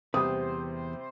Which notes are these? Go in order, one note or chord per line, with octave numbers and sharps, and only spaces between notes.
E2 C3 G3 G4 B4 C5 D#6